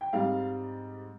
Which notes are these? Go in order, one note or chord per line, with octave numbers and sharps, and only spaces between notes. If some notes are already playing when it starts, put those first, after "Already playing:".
G5
G#2 G3 C4 F5